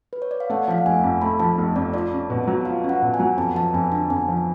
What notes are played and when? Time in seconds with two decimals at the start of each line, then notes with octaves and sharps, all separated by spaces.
0.13 B4
0.22 C#5
0.31 D5
0.40 F5
0.50 A3 F#5
0.65 D5
0.68 F3 F5
0.78 F#5
0.86 F1 G#5
1.04 F2
1.21 A3 B5
1.40 F3 A5
1.58 F1
1.76 F2 D5
1.94 F4 D5
2.11 C#4
2.30 B2
2.48 F#3
2.65 F4 F5
2.84 C#4
2.89 F#5
3.02 B2
3.14 G#5
3.20 F#3
3.37 F2 A5
3.55 F3 A5
3.73 F2 G#5
3.92 D3 A5
4.10 F2 G#5
4.28 F3